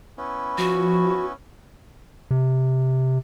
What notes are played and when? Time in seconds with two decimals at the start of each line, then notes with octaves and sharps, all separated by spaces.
0.18 B3 C#4 E4
0.58 F3 F#4
2.31 C3